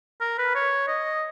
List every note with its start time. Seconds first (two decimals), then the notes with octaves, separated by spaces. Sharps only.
0.21 A#4
0.39 B4
0.55 C#5
0.88 D#5